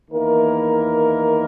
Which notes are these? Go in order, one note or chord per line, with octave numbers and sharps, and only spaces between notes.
E2 D#3 A#3 E4 A#4